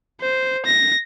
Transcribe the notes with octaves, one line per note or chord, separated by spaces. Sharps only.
C5
A#6